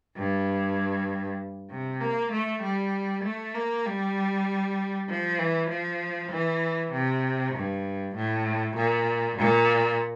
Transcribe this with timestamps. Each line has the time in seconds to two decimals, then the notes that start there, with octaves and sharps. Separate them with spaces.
0.17 G2
1.71 C3
2.01 A#3
2.32 A3
2.63 G3
3.24 A3
3.55 A#3
3.86 G3
5.09 F3
5.38 E3
5.70 F3
6.31 E3
6.92 C3
7.54 G2
8.15 A2
8.76 A#2
9.38 A#2